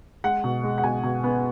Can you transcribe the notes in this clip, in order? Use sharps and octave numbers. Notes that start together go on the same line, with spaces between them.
G#3 F#5
B2
G#3
F#5
B2 G#5
B2
B3